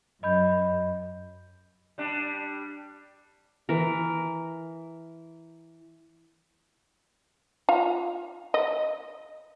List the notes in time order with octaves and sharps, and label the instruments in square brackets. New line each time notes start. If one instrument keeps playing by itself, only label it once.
[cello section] F#2 [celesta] D#5 B5 G6
[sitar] G3 D4
[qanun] E3 A#4
[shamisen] F4 F5
D#5